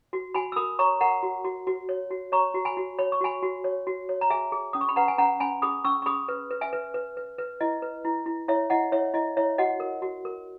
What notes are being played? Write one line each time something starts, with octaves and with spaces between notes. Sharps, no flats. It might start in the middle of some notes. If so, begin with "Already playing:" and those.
F#4
F#4 G#5 B5
E6
A#4 B5 D#6
C#5 A#5 C#6
A#4 F#5 A#5
F#4
F#4
F#4
C#5
F#4
C#5 A#5 C#6
F#4
G#5 B5
F#4
C#5 B5
C#6
F#4 G#5 B5
F#4
C#5
F#4
C#5
A#5
G#4 E5 G#5
G#4
C#4 D#6
C#6
B5
B4 F#5 A#5
G#5
C#4 F#5 A#5
C#4 G#5 B5
G#4 B5 D#6
C#4 C#6 E6
C#6
G#4 B5 D#6
B4
B4
E5 G#5
B4
B4
B4
B4
E4 D#5
B4
E4
E4
E4 C#5 E5
E4 D#5 F#5
E4 C#5 E5
E4 D#5
E4 C#5 E5
F#4 D#5 F#5
A#4
F#4
A#4